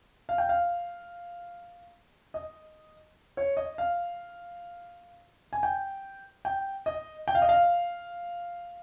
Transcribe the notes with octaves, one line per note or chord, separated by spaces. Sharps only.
F5
G5
F5
D#5
C#5
D#5
F5
G#5
G5
G5
D#5
G5
F5
D#5
F5